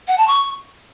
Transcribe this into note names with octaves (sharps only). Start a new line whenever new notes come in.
F#5
A5
C#6